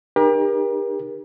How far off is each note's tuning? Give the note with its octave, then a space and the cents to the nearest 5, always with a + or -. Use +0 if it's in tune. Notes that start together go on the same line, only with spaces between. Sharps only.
D#4 -35 G4 +35 A#4 +35